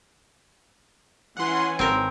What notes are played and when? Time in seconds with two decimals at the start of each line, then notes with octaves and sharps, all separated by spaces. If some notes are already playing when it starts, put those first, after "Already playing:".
1.37 E3 C#4 F#5 G#5 C6
1.79 G#1 C4 A#4